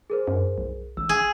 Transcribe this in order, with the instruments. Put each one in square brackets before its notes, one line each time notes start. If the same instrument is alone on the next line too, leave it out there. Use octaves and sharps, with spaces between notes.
[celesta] G#4 A#4 C5
[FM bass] F#2
B1
[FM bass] A1 [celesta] E6
[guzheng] G#4